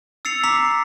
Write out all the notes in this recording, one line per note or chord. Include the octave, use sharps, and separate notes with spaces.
E6 A6 C7 C#7 F7
A#5 D6 B6 C7 F7